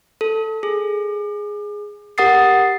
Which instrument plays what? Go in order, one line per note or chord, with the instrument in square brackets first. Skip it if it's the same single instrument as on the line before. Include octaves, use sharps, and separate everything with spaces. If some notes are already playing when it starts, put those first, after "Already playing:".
[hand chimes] A4
G#4
G4 A#4 F#5 D#6 A6 C7